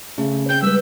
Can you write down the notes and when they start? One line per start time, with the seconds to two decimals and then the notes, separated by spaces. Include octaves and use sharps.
0.18 C#3 A3
0.49 C4 G5 G6
0.62 G3 G#3 B3 B4 E6